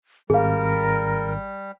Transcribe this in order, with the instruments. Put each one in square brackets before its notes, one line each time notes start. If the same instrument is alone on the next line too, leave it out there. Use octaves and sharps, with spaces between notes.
[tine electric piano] G#1 [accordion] G3 [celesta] G#4 F5 [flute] A#4